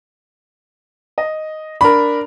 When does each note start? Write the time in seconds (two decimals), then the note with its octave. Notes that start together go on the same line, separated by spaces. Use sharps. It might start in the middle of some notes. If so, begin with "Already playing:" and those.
1.18 D#5
1.81 D4 A#4 B5